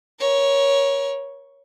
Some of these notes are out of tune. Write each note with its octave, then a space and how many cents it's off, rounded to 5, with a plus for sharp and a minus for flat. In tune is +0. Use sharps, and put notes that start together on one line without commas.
A#4 +30 C#5 +0